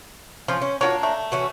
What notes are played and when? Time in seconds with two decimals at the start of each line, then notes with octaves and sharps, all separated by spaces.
0.48 F3 C#4 C6
0.62 C#4
0.81 A#3 D4 F4 F#4 C#5
1.03 A3
1.32 E3 C#4 F#4